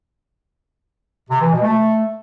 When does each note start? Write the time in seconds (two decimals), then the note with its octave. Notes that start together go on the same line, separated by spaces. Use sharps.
1.30 C3
1.40 E3
1.51 B2
1.62 A3